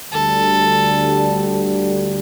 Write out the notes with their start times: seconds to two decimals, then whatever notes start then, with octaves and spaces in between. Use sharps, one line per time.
0.11 D2 D3 G3 A4